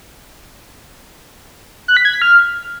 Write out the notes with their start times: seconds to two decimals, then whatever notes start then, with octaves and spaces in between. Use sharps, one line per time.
1.88 F#6
1.97 B6
2.05 G#6
2.13 B6
2.22 F6